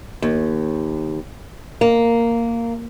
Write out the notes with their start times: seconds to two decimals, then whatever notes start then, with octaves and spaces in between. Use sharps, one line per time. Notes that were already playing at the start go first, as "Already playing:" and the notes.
0.22 D#2
1.81 A#3